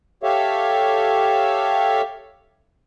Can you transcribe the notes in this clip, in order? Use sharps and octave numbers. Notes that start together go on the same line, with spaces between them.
G4 A4 C#5 E5 F5